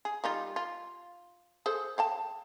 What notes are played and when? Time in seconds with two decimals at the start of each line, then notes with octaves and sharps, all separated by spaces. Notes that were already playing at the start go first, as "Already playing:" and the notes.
0.05 G#4
0.24 G3 D#4 F4
0.56 F4
1.66 G#4 A4 C5
1.98 F5 G5 A5